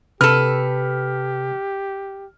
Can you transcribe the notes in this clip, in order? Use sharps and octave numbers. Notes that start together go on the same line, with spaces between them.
C3 G4 A4 B4 F6